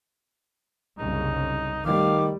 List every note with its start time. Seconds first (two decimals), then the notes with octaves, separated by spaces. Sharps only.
0.98 F#1 C2 C#3 D#4
1.85 D#3 G3 A3 F5 D6